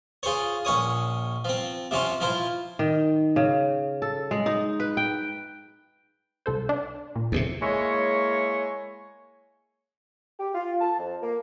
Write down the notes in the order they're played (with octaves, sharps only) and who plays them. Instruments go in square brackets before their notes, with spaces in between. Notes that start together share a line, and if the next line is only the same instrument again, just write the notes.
[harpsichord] F4 G#4 C5 C#5
A#1 C#4 C#5 D#6
F3 C4
C3 F3 C#4 F4
F3 E4 F4 C5
[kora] D#3
C#3
A4
G#3
D#4
B4
G5
[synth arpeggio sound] C2 A4 C5
D4
A#2
[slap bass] D#2 A2 C3
[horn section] G#3 A#3 E4 C#5
[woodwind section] G4
F4
A5
F2
A#3